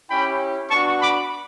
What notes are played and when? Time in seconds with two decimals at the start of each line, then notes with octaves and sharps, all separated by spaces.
0.10 C#4 E4 G4 G5 B5
0.70 B3 D4 F#4 A5 C#6
1.01 B5 D6